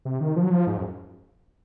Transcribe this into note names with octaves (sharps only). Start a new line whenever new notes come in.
C3
D#3
F3
F#3
F3
G#2
F#2